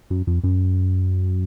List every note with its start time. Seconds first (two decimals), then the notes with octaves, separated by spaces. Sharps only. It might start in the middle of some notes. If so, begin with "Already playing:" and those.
0.10 F#2
0.27 F2
0.44 F#2